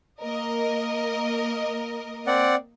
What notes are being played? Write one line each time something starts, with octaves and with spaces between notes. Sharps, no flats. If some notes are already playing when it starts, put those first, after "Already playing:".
A#3 A#4 D#5
C4 D5 F#5